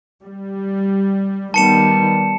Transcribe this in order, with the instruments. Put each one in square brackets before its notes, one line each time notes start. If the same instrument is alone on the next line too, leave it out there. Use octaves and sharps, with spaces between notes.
[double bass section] G3
[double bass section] D#3 G3 B3 [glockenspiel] A5 C#7 E7